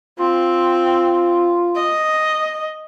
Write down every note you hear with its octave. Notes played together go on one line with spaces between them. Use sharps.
C4 F4
D#5